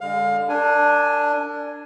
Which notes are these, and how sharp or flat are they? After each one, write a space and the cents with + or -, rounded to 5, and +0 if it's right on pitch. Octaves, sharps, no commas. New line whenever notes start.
D3 +0 G#3 -30 F5 +25
D4 +0 A#4 -40 G#5 +0